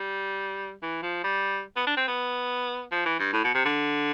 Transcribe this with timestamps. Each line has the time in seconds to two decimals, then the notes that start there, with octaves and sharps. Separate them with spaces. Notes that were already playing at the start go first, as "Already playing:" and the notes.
Already playing: G3
0.83 E3
1.03 F3
1.24 G3
1.76 B3
1.87 D4
1.97 C4
2.08 B3
2.92 F3
3.06 E3
3.19 G2
3.33 A2
3.44 B2
3.55 C3
3.65 D3